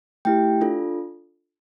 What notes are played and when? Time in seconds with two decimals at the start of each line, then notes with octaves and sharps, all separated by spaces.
0.25 A3 E4 G4 G5
0.61 D4 F4 A4